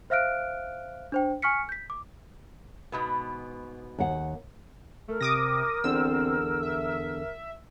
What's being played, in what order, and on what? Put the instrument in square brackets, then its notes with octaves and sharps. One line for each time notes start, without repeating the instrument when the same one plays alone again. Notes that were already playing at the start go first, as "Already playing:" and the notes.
[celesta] C5 E5 F5 F6 F#6 D7
D4 C5 G5
G#5 C#6 F6 B6 C#7
G6 B6
D6
[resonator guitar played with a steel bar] G#2 B2 B3
[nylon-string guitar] D#2 F#5
[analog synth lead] A3 [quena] A#4
[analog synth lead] C3 [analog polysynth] D6 D#6 A#6
[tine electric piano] E2 D3 [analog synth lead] C4 [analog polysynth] E6
[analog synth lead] E5